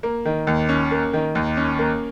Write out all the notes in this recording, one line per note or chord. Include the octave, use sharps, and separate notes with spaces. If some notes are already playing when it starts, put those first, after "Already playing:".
A#3
D#3
D#2
C#4
A#3
D#3
D#2
C#4
A#3